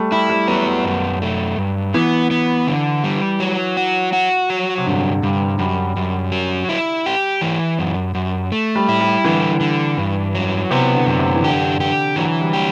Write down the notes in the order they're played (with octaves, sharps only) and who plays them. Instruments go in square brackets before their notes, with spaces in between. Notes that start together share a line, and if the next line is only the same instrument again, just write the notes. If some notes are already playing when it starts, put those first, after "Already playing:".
Already playing: [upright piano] G3 A3
[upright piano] G3 [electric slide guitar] E4
[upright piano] G3
[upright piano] F#3 [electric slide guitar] B3
[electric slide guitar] F#2
A3
G2
[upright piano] E3 [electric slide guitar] B3
[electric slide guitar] B3
D3
G3
F#3
F#4
F#4
F#3
[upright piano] C3
[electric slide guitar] G2 [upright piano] D3
[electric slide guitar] G2 [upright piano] G3
[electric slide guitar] F#2 [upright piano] G3
[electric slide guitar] F#2
F#3
E4
G4
E3
F#2
F#2
A3
[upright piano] G3
[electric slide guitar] E4
[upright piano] G3
[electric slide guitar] D3 [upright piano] E3
[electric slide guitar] D3
G2
F#3
[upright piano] C3 [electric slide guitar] B3
[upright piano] D3
[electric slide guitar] F#2
[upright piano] C3
E3
[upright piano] D3 [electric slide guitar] G4
[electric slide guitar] G4
[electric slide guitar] E3 [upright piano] F#3
[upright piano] G3
[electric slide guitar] G4